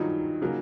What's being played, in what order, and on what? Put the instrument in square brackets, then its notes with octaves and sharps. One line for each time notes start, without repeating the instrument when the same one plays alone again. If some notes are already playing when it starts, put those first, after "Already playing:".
Already playing: [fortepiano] G2 D#3 F#3 [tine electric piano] D#4 F4
[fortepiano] C#3 F#3 A#3